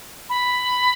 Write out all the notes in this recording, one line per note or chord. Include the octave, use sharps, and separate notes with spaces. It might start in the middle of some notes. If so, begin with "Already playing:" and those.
B5